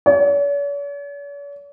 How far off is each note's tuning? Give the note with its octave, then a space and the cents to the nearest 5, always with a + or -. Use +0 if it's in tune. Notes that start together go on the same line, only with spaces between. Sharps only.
C#5 +45